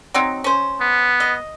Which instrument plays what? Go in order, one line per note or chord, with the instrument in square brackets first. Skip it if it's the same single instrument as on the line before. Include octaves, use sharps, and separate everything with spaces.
[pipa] F#3 C4 D#4
C#4 C5
[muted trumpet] B3
[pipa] D#5